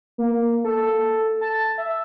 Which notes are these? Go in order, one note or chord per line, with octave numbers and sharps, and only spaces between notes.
A#3
A4
A5
E5